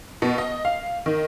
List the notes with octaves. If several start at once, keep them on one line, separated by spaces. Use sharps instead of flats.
B2
D#5
F5
D#3